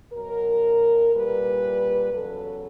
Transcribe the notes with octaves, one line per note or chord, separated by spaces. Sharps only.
B2 F#3 A#4
A#2 G3 B4
E2 C#3 F#3 A4